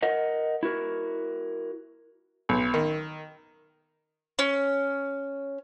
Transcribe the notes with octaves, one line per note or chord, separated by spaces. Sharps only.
A#4 D#5 F#5
E4 F#4 A#4
B1
D#3
C#4